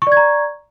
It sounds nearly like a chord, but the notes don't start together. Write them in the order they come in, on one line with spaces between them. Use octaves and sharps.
C#6 D5 G#6 A#5